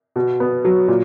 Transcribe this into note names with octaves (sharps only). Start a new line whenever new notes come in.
B2
B3
F#3
A#2